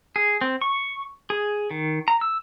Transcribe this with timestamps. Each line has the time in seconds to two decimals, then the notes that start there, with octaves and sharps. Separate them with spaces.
0.16 G#4
0.41 C4
0.61 C#6
1.30 G#4
1.71 D#3
2.08 A#5
2.21 E6